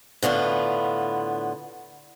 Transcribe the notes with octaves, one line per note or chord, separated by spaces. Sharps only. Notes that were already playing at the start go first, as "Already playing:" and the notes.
A2 D3 B3 F4